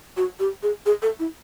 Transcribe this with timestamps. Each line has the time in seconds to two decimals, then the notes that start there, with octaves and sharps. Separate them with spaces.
0.17 F#4
0.40 G4
0.63 G#4
0.86 G#4
1.02 A4
1.19 E4